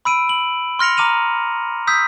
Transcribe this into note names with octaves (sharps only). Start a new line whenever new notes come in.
B5 E6 D7 D#7
F#7
C6 F6 A#6 C#7 F7
A#5 D6 F6 D#7 F7
D#6 E6 G6 B6